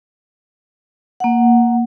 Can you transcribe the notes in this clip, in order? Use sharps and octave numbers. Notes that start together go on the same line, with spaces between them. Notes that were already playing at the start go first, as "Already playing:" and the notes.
A#3 F#5